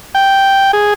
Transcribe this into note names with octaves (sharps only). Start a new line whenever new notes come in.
G5
G#4